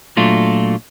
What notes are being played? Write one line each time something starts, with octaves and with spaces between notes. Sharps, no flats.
A#2 F#3 A3 D4 F4